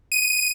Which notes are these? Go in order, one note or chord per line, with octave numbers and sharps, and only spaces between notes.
D#7